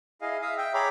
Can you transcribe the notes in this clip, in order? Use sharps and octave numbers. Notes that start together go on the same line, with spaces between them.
E4 G#4 D#5 F5
E5 F5 D#6
E5 G5
G#4 C#5 G5 A#5 B5 D6